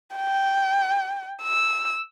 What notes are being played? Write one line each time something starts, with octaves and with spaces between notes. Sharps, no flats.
G5
E6